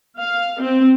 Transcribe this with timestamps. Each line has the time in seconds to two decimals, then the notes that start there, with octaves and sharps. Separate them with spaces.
0.20 F5
0.62 C4